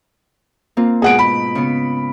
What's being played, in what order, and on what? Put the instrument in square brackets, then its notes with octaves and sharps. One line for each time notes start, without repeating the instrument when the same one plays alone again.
[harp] A#3 C4 F4
[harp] G#2 B2 [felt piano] G#4 F#5 D7
[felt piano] B5
[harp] C#3 B3